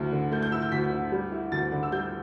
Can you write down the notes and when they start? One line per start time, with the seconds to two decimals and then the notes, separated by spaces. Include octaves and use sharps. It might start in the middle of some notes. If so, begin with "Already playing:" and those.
Already playing: D2 A3 E4
0.12 D3
0.31 A3 G6
0.43 G6
0.52 E4 E6
0.62 G6
0.72 D2 B6
0.93 D3
1.12 G3
1.32 E4
1.52 D2 A6
1.72 D3
1.83 E6
1.92 G3 G6